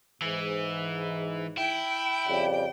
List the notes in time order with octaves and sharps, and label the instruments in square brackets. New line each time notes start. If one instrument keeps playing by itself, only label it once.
[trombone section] G#2 [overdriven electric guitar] E3
[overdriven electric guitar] E4 [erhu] G5
[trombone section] F2 C#3 G3